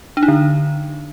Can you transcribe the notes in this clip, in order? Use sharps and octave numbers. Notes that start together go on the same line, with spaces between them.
D4
D#4
D3